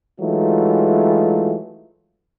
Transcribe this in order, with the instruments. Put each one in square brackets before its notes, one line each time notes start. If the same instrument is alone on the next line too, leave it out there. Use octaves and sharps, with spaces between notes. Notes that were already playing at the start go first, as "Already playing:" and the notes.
[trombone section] E3 F#3 G#3 A3 D#4 F4